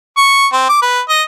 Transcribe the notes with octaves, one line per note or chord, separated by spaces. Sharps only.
C#6
C4
D6
B4
D#5